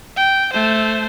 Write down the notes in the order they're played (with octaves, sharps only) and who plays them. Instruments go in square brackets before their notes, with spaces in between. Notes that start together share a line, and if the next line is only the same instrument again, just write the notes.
[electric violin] G5
A3 C5